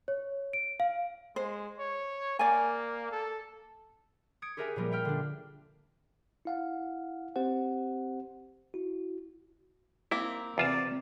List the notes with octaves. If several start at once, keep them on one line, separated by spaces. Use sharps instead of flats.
C#5
D7
F5
G#3 C5
C#5
A#3 D5 G#5
A4
D#6 G#6 C#7 D7
G4 G#4 A#4 B4 E5 G#5
A#2 F3 G3 A#3
E5 G5 F6
D3 D4
E4 F5 F#5
C4 G4 C5 F#5
E4 F#4
A#3 C4 E4
E2 C3 F4 D5 A5